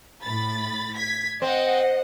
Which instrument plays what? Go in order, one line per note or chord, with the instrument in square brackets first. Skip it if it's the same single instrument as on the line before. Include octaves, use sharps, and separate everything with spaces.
[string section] A2 B5 A6
G#6 B6
[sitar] C4 [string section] D#5 F#5